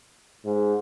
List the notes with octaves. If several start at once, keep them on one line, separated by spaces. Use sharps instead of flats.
G#2